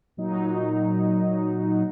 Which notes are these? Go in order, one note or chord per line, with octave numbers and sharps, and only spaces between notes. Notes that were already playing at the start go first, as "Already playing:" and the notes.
A#2 F#3 D#4